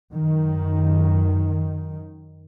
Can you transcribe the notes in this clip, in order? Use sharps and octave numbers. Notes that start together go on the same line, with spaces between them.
F#2 D#3